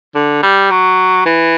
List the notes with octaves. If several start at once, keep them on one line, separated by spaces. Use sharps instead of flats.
D3
G3
F#3
E3